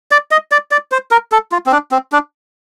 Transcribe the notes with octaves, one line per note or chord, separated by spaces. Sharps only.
D5
D#5
D5
D5
C5
A#4
A4
F4
C4
D4
C4
D4